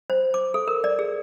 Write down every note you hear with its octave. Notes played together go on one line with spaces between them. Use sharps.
C5
D6
A4
A#4
D5
G#4